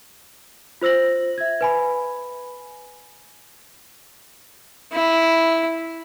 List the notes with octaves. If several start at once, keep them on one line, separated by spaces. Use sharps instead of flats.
F4 C5 E6 A#6 F#7
E5 G#6
B4 G#5 B5
E4